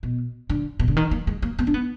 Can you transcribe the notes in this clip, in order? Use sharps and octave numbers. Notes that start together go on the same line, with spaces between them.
B2
D3
B2
D3
D#3
A#3
G#3
A#3
B3
D4
B3